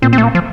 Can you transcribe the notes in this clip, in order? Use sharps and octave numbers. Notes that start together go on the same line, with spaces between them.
A#2 C4
C4
A3
A#3
F3